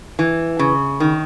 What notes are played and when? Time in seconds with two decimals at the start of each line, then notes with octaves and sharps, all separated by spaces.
0.19 E3
0.59 C#3
1.00 D#3